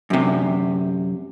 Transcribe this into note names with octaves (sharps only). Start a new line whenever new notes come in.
F#2 C3